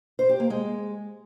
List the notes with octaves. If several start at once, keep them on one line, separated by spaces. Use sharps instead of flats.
C5
G4
A#3
G#3